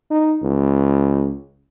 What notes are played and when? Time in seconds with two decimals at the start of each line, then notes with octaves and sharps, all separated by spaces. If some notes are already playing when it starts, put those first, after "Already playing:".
0.11 D#4
0.43 C#2